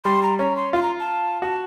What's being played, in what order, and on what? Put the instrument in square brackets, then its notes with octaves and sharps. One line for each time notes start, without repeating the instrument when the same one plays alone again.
[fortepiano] G3 [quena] C6
[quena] A#5
[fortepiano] C#4 [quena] A#5
[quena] C6
[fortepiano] F4 [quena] C6
[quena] A#5
A5
[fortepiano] F#4 [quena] A5